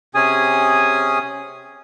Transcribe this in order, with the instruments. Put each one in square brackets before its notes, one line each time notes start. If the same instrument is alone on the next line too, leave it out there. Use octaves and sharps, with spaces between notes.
[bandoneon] C3 C#4 G#4 G#5 D#6